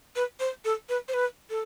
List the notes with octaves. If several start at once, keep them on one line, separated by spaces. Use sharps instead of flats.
B4
C5
A4
B4
C5
B4
A4